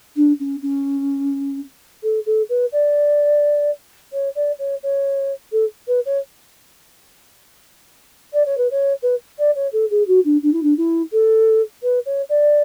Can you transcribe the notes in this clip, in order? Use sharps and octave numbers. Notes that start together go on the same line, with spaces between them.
D4
C#4
C#4
A4
A4
B4
D5
C#5
D5
C#5
C#5
A4
B4
C#5
D5
C#5
B4
C#5
B4
D5
C#5
A4
G#4
F#4
D4
D4
E4
D4
E4
A4
B4
C#5
D5